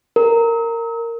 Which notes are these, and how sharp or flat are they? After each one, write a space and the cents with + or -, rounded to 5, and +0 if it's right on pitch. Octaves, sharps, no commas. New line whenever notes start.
A#4 -15